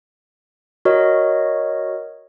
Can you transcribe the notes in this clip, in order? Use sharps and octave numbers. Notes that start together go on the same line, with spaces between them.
F#4 A#4 C#5 D#5